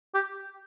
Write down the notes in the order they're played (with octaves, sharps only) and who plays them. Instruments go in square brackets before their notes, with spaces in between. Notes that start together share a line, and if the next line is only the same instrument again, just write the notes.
[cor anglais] G4